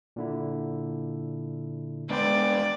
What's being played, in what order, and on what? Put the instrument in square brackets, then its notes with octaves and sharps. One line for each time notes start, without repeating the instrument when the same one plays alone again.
[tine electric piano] A#2 D3 E4
[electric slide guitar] G#3 B3 B4 [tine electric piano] D4 G5 C6 [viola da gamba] D5